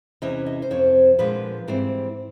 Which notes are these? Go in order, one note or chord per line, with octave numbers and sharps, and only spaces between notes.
E2 C3 E3 C#4 D#5
D#5
C5
F2 C3 F3 C4 C#5
A#2 F3 G#3 B3 D4 B4
G#2 E3 G3 C4 C5